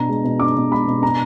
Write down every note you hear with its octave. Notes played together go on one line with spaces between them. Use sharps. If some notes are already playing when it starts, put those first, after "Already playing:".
Already playing: B2 D4 A#5
G#3
B2
D4 D6
B2
G#3 B5
B2
D4 A#5